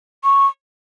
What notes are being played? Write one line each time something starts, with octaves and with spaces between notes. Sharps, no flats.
C#6